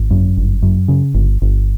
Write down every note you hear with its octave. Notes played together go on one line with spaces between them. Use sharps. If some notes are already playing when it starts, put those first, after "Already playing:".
Already playing: G#1
F#2
G1
F#2
C#3
G1
G1